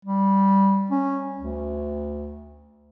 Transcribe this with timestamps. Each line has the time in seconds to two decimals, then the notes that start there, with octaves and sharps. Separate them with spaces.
0.05 G3
0.90 C#4
1.39 D2